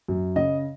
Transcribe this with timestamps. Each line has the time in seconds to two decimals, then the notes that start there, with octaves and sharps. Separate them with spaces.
0.08 F#2
0.36 C#3 D#5